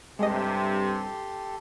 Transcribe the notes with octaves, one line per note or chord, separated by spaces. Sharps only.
G2 C3 G#3 G4 A4 D#5 C6